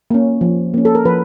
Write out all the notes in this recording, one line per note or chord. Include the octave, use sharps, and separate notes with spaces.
A#3 C#4
F3
A#3 C#4
A4
A#4
F3 B4